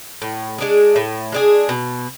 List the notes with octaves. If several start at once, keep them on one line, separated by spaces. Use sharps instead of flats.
A2
G#3 D4 G#4
A2
G#3 D4 G#4
B2